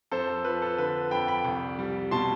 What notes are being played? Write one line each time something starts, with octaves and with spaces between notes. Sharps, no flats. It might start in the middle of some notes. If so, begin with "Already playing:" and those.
F2 A4 C5
A4
F3 B4
A4
D3 B4
F2 G5 B5
G5 B5
C2
G3
B2 A5 C6